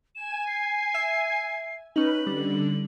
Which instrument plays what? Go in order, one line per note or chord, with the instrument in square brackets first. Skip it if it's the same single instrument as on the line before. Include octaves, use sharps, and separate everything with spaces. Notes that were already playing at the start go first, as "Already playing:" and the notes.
[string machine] G#5 [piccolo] E7
[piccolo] C7
[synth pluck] E5
[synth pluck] C#4 D#4 [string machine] B4 [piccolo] F#7
[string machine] D3 [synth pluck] G3